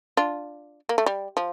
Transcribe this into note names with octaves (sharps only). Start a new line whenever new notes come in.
D4 F4
A#3
A3
G3
F3